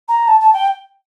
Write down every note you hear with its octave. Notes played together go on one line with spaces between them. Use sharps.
A#5
A5
A5
G5